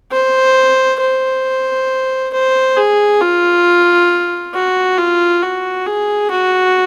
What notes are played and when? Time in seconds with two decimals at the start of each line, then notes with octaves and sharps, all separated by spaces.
0.12 C5
1.01 C5
2.33 C5
2.77 G#4
3.21 F4
4.54 F#4
4.98 F4
5.42 F#4
5.87 G#4
6.31 F#4